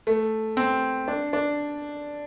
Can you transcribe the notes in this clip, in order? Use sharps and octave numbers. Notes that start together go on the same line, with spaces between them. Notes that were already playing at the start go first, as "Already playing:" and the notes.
A3
C4
D4
D4